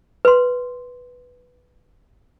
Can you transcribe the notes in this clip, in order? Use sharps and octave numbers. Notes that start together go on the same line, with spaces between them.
B4 C6